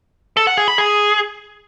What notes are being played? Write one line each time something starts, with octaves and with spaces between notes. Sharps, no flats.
A4
F#5
G#4
B5
G#4